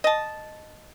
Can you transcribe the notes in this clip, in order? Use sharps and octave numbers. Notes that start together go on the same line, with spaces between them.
D#5 A5